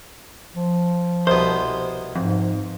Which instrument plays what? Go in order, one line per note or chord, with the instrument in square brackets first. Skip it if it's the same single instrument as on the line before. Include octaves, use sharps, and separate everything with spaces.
[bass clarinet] F3
[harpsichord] C2 B2 [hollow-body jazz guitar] C5
[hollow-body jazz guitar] F2 [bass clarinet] G#2